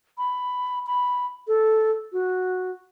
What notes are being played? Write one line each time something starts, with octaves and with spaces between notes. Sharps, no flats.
B5
B5
A4
F#4